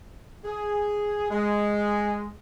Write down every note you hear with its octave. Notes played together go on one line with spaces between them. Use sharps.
G#4
G#3